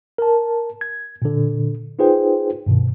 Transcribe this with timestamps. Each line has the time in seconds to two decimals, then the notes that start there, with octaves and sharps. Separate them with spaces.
0.18 A#4 A5
0.81 G#6
1.22 A#2 D3
1.99 D#4 F4 G#4 B4 C5 G5
2.66 G2 B2 D#3